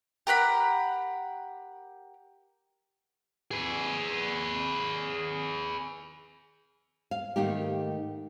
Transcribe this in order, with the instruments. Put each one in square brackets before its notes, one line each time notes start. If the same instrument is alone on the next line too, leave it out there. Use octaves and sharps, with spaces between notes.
[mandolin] G4 A#4 F#5 B5
[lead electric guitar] G#4 B4
[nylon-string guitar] F5
G#2 D#3 A3 A#3 D#4 G4